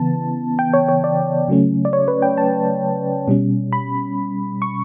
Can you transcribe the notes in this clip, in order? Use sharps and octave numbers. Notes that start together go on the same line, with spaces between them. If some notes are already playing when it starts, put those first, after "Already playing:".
Already playing: C#3 E3 B3 A5
G5
C#5
C#5
D5
C#3 F#3 A3 C#4
D5
C#5
B4
G5
A5
B2 G3 C#4
B5
C#6